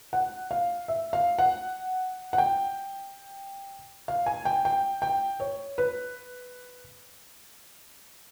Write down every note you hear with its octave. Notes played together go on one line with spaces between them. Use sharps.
F#5
F5
E5
F5
F#5
F#5
G5
F5
G#5
G5
G5
G5
C#5
B4